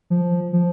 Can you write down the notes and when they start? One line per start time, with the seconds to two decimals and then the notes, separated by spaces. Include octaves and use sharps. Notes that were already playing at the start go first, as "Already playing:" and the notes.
0.10 F3
0.53 F3